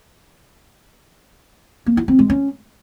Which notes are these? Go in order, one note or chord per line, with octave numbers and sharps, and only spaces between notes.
A#3
E4
C4
G#3
C#4